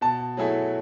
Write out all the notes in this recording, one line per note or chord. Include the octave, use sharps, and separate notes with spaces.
B2 A5
F#3 A3 E4 G#4